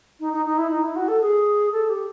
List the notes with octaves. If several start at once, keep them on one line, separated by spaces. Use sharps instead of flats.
D#4
D#4
D#4
E4
D#4
E4
F#4
A4
G#4
A4
G4